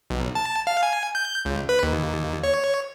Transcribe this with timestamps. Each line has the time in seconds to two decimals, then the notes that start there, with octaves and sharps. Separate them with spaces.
0.10 B1
0.35 A5
0.67 F5
0.83 G#5
1.15 G6
1.45 C#2
1.69 B4
1.83 D#2
2.44 C#5